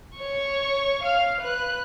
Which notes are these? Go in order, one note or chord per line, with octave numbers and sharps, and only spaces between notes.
C#5 C#6
F5 F6
B4 F#6